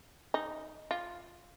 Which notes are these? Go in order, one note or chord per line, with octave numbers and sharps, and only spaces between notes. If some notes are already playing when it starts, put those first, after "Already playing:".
D#4
F4